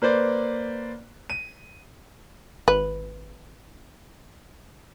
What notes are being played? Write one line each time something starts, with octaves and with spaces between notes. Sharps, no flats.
A#3 B4 C5 D5
D#7
G#1 B4